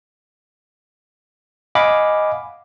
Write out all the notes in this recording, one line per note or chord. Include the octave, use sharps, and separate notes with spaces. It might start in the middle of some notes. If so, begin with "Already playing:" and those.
D#5 F5 F#5 G#5 B5 D6